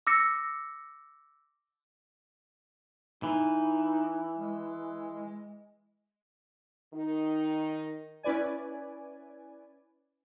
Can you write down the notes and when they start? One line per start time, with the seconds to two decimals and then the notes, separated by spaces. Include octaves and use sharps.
0.07 D6 E6 A#6 C#7
3.23 E3 D#4
4.37 G#3
6.93 D#3 D#4
8.23 C#4 E4 B4 D5 G#5